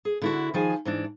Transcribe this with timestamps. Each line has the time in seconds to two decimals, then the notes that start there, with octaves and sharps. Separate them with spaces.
0.05 G#4
0.22 D3 E4 F#4
0.54 D#3 F3 G#4 G#5
0.85 G#2 E3 D4